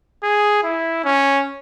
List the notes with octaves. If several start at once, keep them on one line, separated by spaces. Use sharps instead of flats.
G#4
E4
C#4